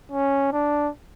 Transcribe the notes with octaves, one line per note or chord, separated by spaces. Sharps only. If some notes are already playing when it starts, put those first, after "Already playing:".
C#4
D4